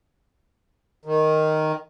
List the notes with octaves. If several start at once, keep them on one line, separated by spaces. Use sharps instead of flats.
D#3